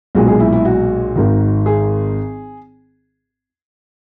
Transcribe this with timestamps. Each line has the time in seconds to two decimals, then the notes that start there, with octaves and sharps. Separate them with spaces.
0.15 B1 A#2 G#3 F#4
0.28 G#4
0.40 E4
0.53 E4
0.65 F#4
1.16 G#1 G#2 D#3
1.66 G#4